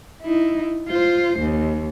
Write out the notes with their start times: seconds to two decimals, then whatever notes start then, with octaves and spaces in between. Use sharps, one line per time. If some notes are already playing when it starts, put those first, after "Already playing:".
0.23 D#4 E4
0.88 F4 C5
1.39 D#2